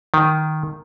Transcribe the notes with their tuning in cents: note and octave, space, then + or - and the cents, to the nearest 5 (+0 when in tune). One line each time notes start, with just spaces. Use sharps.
D#3 +0